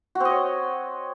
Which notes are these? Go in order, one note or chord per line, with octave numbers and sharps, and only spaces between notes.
C4 F#4 C#5 D#5